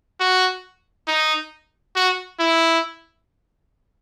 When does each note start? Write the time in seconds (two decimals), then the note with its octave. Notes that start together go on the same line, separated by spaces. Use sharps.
0.20 F#4
1.08 D#4
1.96 F#4
2.39 E4